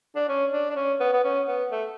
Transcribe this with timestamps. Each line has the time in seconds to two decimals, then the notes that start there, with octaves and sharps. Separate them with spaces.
0.15 D4
0.29 C#4
0.53 D4
0.70 D4
0.76 C#4
1.00 B3
1.13 B3
1.24 C#4
1.48 B3
1.71 A3